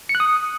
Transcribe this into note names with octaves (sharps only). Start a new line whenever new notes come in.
C#7
F#6
D#6